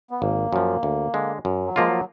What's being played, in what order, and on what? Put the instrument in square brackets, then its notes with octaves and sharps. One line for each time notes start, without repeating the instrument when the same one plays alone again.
[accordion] B3
[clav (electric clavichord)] G#1 [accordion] A#3
[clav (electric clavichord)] F#2 F3
D2
D3 G#3
F#2
[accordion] F#3
[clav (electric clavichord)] F3 A#3 F4 [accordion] G#3
[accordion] F#3